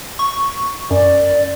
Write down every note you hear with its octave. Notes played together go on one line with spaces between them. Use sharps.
C#6
F#2 D5